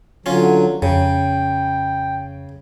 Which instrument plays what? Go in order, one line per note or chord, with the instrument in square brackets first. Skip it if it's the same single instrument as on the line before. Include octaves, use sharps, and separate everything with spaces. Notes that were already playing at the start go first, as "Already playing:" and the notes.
[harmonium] D3 F#3 [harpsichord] C#4 F4
[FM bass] F2 [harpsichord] C#3 [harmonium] G5